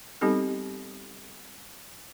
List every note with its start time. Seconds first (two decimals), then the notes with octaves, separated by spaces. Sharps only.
0.21 G3 B3 C4 D#4 G4 A4